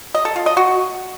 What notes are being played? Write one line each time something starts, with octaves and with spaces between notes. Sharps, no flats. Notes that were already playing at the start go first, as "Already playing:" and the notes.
D#5
A4
F4
D#5
F#4